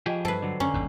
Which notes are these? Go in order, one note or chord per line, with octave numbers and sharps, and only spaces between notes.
F3 F4 G4 G#4 D#5 G5
G2 A4 B4 C5 C7
D3 F#3
F#2 D3 C#4 A#5
G1 D#2 G#2